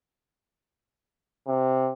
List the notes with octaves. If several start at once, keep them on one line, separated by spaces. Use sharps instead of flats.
C3